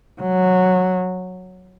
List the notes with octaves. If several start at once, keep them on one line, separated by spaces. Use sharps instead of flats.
F#3